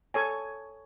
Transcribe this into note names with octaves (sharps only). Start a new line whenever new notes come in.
A4 C#5 G#5